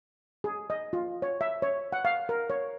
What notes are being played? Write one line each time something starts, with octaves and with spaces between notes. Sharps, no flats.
G#4
D#5
F4
C#5
E5
C#5
F#5
F5
A#4
C#5